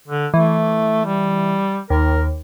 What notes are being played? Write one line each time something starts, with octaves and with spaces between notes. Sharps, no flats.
D3
E3 A3
G3
D#2 A#4